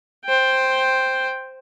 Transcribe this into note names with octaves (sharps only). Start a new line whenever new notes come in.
C5 G5